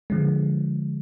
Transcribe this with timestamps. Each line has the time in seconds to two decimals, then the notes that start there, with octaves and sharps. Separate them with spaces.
0.10 D3 F3 G#3